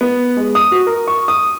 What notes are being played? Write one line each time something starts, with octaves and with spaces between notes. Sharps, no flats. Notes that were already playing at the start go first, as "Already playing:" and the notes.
B3
G#3
D#6
F#4
A#4
C#6
D#6